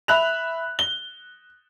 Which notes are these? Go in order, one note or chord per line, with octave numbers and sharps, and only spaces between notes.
E5 B5 F#6 F7
G7